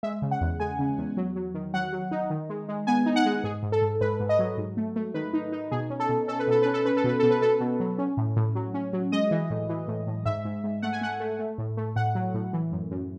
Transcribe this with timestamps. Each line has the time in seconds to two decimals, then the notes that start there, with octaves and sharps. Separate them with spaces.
0.03 G#3 E5
0.22 C#3
0.31 F#5
0.41 E2
0.60 G#3 G#5
0.79 C#3
0.98 E2
1.17 F#3
1.36 F#3
1.54 D#3
1.74 F#3 F#5
1.93 F#3
2.11 D#4
2.30 D#3
2.50 G#3
2.69 G#3
2.87 B3 G#5
3.06 D#4
3.16 F#5
3.25 G#3
3.44 G#2 G#4
3.63 G#2
3.72 A4
3.82 G#2
4.01 G#2 B4
4.20 G#2
4.29 D#5
4.39 F#3
4.58 G#2
4.77 A3
4.96 A3
5.14 D#3 B4
5.33 D#4
5.52 D#4
5.71 B2 G#4
5.90 C#4
6.00 A4
6.09 B2
6.28 C#4 A4
6.39 B4
6.47 B2 A4
6.62 C#4 B4
6.74 A4
6.85 C#4 B4
6.97 A4
7.04 B2 B4
7.20 B2 A4
7.31 B4
7.41 B2 A4
7.60 B2
7.80 F#3
7.98 C#4
8.17 A2
8.36 A2
8.55 F#3
8.74 C#4
8.93 F#3
9.12 G#3 D#5
9.31 E3
9.50 A2
9.69 E3
9.88 A2
10.07 A2
10.25 G#2 E5
10.45 G#2
10.64 G#2
10.82 A3 F#5
10.93 G#5
11.01 A3 F#5
11.20 A3
11.39 A3
11.58 A2
11.77 A3
11.96 A2 F#5
12.15 F#3
12.34 A2
12.53 E3
12.72 F#2
12.91 F#2